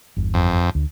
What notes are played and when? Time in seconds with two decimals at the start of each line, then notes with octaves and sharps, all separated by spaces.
0.17 G1 E2 G2
0.34 F2
0.75 D2